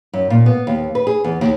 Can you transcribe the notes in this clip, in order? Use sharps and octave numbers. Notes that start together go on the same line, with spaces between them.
F#2
A#2
B3
D#2
B4
G#4
E2
D#2